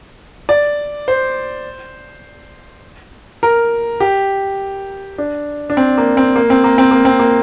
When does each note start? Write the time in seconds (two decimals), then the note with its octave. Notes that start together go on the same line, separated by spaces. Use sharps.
0.49 D5
1.08 C5
3.43 A#4
4.00 G4
5.18 D4
5.70 D4
5.77 C4
5.98 A#3
6.17 C4
6.36 A#3
6.50 C4
6.64 A#3
6.78 C4
6.91 A#3
7.05 C4
7.19 A#3